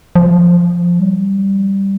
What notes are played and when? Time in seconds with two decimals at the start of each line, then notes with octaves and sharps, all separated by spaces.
0.16 F3
1.00 G3